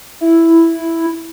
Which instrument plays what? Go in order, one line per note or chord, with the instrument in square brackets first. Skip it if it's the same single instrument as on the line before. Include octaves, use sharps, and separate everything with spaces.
[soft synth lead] E4